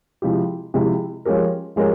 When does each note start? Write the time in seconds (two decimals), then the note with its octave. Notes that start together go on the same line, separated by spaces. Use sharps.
0.22 C3 F3 G#3 E4 G4
0.74 C3 F3 G#3 E4 G4
1.25 F3 G#3 C#4 G4 A#4
1.76 F3 G#3 C#4 G4 A#4